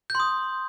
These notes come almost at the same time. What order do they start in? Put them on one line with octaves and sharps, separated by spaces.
G6 C6 D#6